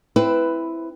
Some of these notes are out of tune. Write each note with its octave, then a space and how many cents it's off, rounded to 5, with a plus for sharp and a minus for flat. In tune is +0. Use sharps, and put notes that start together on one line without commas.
C4 +0 E4 +0 B4 +10